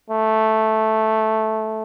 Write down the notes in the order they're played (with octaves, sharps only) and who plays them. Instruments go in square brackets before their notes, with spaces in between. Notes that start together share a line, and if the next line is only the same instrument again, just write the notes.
[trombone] A3